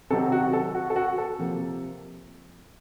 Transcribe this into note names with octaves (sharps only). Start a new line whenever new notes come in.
C3 D#3 F#3 C4 A4
F#4
A4
F#4
A4
F#4
A4
C3 F3 A#3